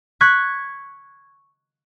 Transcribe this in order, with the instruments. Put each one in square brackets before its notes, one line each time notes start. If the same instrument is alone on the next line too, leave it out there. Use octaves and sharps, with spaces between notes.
[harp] C#6 F#6 G#6 B6